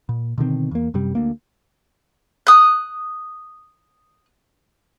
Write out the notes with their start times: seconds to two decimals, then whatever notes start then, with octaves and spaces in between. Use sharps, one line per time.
0.09 A#2
0.38 B2 D3 D#3 C4
0.71 E2 A#3
0.94 F#2 C3 G3
1.15 D2 A#3
2.47 D#6 F#6